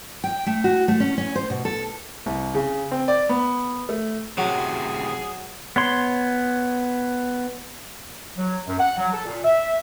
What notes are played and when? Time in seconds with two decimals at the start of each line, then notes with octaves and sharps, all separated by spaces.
0.24 G5
0.46 A3
0.64 F#4
0.88 A3
1.00 C#4
1.18 C#4
1.35 C5
1.50 B2
1.65 A4
2.26 C2
2.54 C#3
2.91 C4
3.08 D5
3.29 B3
3.89 A3
4.38 F#2 A2 C3 F#3 G#4
5.76 B3 C#5 C6
8.38 F#3
8.67 F#2
8.79 F#5
8.98 F#3
9.12 A4
9.26 A#2
9.45 E5